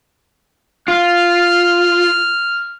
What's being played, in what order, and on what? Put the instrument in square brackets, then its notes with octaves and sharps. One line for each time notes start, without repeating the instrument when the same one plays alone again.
[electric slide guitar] F4 [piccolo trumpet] F6